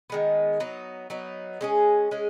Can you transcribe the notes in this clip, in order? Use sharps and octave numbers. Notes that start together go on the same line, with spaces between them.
D#3 G#3 B3
F#3 B3 D#4
F#3 B3 D#4
G#3 C#4 G#4
G#3 C#4 G#4